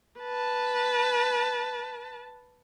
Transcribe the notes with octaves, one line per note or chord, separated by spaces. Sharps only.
B4 A5